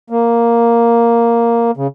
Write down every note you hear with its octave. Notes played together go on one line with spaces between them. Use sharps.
A#3
C#3